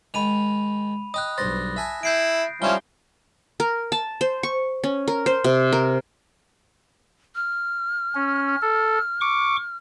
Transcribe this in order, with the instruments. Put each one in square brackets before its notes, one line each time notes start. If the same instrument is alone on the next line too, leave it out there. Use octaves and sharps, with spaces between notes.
[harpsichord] D#3 G#3 [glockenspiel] B5 D#7 F7
[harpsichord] D#5 G5 [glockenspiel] D#6 F#6
[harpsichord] B1 G2 C5 [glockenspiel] A6 A#6
[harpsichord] E5 G#5 A5
[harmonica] E4 [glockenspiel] G6 C7 D7
[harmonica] F3 C#4 E4 [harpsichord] G3 D#4 [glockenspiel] G7
[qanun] A#4
A5
C5
C#6
C#4
A#4
C5
C3
A#4
[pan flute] F6
[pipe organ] C#4
A4
C#6 D6